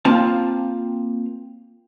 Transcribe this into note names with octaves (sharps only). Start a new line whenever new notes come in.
A#3 C4 F4 A5